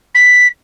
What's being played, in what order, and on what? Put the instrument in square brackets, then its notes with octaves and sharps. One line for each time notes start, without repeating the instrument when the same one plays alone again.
[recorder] B6